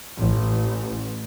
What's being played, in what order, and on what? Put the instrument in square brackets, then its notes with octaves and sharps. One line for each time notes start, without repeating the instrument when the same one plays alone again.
[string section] A1